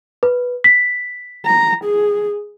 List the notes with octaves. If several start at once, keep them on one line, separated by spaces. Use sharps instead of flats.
B4
B6
A#5
G#4